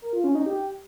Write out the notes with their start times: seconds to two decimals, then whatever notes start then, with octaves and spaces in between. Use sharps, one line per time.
0.02 A#4
0.13 F4
0.24 C#4
0.35 D#4
0.46 G4